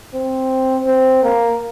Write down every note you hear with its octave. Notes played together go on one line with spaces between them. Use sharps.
C4
C4
A#3